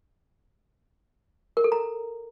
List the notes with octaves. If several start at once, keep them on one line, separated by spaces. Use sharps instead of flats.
A#4
A4
A#5